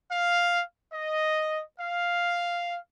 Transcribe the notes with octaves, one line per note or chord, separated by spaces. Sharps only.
F5
D#5
F5